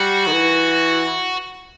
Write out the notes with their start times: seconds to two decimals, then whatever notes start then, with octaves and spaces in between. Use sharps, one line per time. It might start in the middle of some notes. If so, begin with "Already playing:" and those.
Already playing: G3 F#4
0.27 D#3
0.32 E3